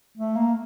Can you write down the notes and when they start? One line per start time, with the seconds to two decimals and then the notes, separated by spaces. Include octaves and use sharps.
0.17 A3
0.36 A#3